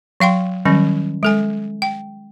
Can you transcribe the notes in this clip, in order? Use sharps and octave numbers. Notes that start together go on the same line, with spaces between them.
F#3 F5 G5 C6
D#3 F#3 G3 C#4
G#3 A4 G#5
G5